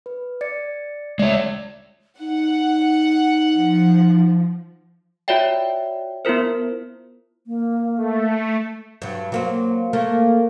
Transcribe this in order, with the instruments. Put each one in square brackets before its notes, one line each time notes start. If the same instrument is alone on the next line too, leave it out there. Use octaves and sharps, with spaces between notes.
[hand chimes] B4
D5 A6 C#7
[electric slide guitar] G#3 C#5 [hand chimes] D5 E5
[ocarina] D#4 [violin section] F#5
[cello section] F3
[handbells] F4 F#4 C#5 D5 E5 G5
B3 E4 F4 A#4 C5
[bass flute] A#3
[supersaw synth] A3
[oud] G2 F#3
F#3 A#3 C4
A3 A#3 A#4